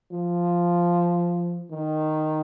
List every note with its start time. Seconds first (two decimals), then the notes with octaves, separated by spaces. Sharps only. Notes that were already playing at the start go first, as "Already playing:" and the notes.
0.11 F3
1.71 D#3